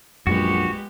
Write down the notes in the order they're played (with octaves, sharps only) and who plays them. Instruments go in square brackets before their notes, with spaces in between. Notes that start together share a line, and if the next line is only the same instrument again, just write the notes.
[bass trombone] A#1 [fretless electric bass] F#2 [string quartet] G#3 B3 G4 [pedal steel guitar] F#4